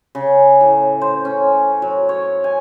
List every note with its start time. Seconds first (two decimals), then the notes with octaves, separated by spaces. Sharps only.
0.15 C#3
0.61 A2
1.01 C5
1.25 C#4
1.82 F#3
2.09 C#5
2.44 G#5